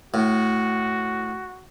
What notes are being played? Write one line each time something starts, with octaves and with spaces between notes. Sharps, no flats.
A2 F#4